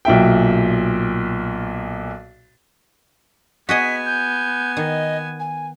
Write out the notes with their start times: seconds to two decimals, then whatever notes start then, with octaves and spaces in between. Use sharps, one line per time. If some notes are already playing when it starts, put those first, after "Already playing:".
0.05 B1 A#2 E5 G5
3.69 B3 F#4 G#4 D#5 G#5 B6
4.06 G6
4.77 D#3 D#5
5.40 G#5